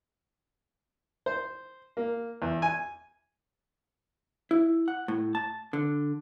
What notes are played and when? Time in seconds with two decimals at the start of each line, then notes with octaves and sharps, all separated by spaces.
1.26 C5
1.97 A#3
2.42 E2
2.62 G#5
4.51 E4
4.88 F#5
5.08 A2
5.35 A5
5.73 D3